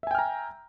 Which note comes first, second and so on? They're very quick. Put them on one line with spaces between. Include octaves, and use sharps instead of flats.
E5 G#5 G5 F6 A#5